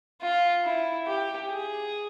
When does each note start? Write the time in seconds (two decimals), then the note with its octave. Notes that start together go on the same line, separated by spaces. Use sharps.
0.22 F4
0.64 E4
1.07 G4
1.49 G#4